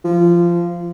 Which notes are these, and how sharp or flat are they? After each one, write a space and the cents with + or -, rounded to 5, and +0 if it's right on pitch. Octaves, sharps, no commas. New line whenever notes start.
F3 -20